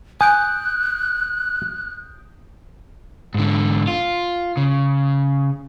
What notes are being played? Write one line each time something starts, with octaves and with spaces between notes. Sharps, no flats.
G#5 D#6 F#6 G6 D7
G#2 D3
F4
C#3